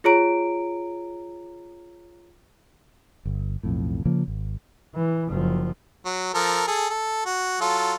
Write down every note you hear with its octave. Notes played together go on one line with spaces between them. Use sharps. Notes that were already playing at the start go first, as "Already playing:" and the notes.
F4 G#4 C#5 A#5 D7
G1
B1 F2 A2
C#3 F3 A#3
G#1
E3
F#1 F3
F#3
F3 A4 A#4
G#4 A4
A4
F#4
F#3 F4 A4